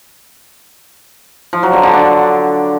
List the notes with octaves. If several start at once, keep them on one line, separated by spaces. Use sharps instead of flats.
F3
F#3
D3
D3
D4